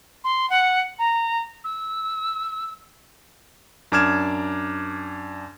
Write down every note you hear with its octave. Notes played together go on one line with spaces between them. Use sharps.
C6
F#5
A#5
E6
F#2 D4 D6 F6 G#6 E7